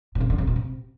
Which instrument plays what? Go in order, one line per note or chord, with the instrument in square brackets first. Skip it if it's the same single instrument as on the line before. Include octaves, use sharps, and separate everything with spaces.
[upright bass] B2
C3
D3
C3
B2
C3